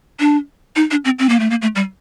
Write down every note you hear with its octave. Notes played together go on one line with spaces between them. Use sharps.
D4
D#4
D4
C4
C4
A#3
A3
A#3
A3
G3